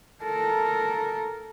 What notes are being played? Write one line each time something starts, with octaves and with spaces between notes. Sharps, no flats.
A4 A#4